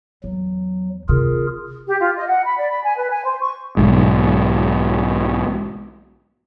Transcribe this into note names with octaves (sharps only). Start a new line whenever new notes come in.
E2 F#3
C3 D#3 F4 G#4 A#4
G4
F4
D#5
F#5
B5
D5
B5
G#5
B4
G#5
C5
C#6
B1 G#2